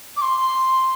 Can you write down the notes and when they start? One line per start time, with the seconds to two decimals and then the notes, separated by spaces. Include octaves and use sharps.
0.17 D6
0.22 C6